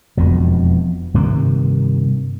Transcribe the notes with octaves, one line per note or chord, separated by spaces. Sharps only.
E1 F2 B2
G2 C3 D#3 A#3